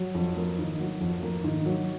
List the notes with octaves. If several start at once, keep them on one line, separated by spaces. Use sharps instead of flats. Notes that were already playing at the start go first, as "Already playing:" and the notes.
Already playing: F#3
F2
A#3
D#3
F#3
F2
A#3
D#3
F#3